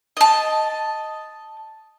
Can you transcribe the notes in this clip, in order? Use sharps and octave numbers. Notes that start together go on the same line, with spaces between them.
D#5 A5